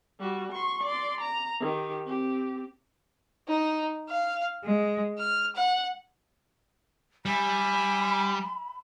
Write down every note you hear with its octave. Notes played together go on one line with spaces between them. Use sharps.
G3 F#4
C6 C#6
D5 C6
A#5
D#3 G4
C4 G4
D#4
F5
G#3
F6
F#5
G3 E5 G#5 B5